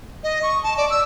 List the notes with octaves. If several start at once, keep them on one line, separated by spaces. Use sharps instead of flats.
D#5
C#6
A5
D5
E6